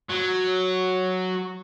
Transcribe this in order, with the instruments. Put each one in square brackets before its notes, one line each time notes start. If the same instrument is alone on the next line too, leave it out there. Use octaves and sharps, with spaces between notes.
[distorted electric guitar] F#3